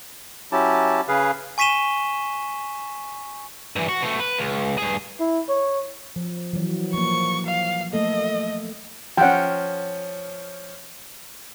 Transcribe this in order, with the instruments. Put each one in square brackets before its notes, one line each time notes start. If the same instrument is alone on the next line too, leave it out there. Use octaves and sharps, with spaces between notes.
[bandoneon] F#3 C#4 E4 G4 A5
C#3 G#4 B4 F5
[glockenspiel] G#5 C#6 B6 D#7 E7 G7
[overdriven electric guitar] G2 E3
F#4
B2 A3
B4
C#2
G2 G#4
[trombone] E4
C#5
[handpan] F3
E3 F#3
[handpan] F3 A#3 [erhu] C#6
[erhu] F5
[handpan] A3 A#3 A4 [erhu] D#5
[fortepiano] F3 C#4 [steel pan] F#5 G5